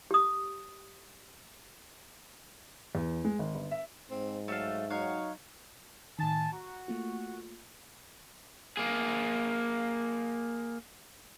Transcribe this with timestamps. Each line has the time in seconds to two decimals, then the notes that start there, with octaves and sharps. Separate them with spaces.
0.11 G4 D#6
2.95 E2
3.25 G#3
3.39 G#1
3.55 G1
3.71 E5
4.11 G#2 C4
4.48 F#3 A3 A4 F5
4.90 F#3 D#4 C#5 F5 F#5
6.19 A2 D#3 G#5 A5
6.53 F#4 A#5
6.88 A3 A#3 F4
8.77 A#3 G#4